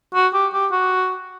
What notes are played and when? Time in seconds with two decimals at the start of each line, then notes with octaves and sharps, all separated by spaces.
0.14 F#4
0.34 G4
0.53 G4
0.72 F#4